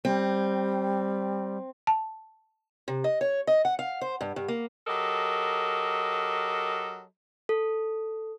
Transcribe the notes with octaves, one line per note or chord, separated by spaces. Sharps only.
G3 C4
A5
C3
D#5
C#5
D#5
F#5
F5
C5
G2
G2
A#3
F#3 G4 A4 A#4 D#5
A4